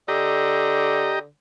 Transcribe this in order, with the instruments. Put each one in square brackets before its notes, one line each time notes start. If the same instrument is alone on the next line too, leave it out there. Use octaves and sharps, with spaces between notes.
[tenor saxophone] D3 [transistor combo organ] G4 D#5 A#5